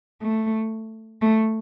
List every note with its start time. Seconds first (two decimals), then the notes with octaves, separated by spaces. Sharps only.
0.22 A3
1.22 A3